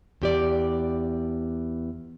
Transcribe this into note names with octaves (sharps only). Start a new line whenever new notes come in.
E2 G4 D5